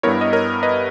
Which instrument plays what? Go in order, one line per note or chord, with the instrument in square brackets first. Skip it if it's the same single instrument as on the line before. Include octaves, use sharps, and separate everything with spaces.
[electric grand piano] G2 G3 B3 E4 A#4 C#5
D#5
A#4 C#5
B4 D#5